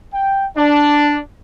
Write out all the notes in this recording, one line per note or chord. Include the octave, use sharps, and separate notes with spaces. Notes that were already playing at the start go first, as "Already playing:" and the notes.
G5
D4